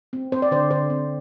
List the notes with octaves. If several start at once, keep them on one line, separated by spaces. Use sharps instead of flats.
C4
C4 C5
D5
D3 C5
D3 C5
C4